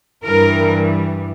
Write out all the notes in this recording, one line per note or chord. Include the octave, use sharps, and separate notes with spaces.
G2 E3 G3 A#4